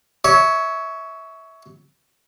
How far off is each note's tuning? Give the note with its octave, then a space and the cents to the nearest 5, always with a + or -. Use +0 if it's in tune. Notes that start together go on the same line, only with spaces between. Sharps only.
C#5 +15 E5 -20 C#6 -25